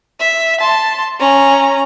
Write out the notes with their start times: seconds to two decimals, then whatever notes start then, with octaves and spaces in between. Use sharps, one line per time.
0.19 E5
0.61 A5 C6
1.19 C#4 A#5